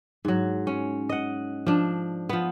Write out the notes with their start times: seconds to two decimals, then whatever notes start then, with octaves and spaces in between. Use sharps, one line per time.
0.25 G#2 F#3
0.67 C#4
1.09 D#5 F#5
1.67 F3 D4
2.29 F3 B3